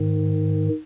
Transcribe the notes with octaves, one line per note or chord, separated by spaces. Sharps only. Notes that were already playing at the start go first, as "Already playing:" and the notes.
Already playing: G#2 D#3